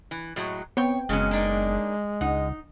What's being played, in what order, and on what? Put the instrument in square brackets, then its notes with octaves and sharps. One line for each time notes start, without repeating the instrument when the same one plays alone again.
[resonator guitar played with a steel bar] E3
A2 F#3 G#3
[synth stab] B3 C4 G5 [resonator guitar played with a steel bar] C#5
[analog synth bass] F#1 [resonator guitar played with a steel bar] C#3 F#3 C#4 [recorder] G#3
[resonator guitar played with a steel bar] A#3 D4 D#4
[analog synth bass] C#2 [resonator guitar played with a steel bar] D#4 [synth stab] F#5